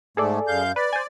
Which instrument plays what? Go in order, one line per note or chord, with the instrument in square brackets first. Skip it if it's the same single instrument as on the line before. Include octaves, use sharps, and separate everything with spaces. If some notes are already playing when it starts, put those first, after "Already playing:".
[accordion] G#2 A3 [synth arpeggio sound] G#4 A4 D5
[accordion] F#2 F5 G6
[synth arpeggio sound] B4 [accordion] D5
[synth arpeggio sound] C5 G#5